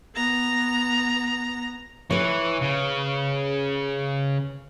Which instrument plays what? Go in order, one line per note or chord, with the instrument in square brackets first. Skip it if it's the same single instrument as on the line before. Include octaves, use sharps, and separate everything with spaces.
[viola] B3 A#5
[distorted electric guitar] E3 [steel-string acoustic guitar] B4 C#5
[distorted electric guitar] C#3